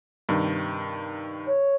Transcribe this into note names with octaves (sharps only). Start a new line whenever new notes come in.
G2 C3 D#3
C#5